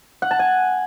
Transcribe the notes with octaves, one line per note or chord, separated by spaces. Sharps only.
F#5
A5
G#5